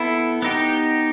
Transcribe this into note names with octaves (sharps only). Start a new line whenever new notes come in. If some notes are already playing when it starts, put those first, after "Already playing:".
Already playing: B3 E4 A4
B3 D#4 G4